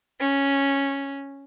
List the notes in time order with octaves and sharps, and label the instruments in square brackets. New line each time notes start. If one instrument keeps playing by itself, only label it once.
[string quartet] C#4